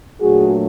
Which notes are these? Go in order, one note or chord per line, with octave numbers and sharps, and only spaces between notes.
A#2 F#3 A3 D4 F#4 G#4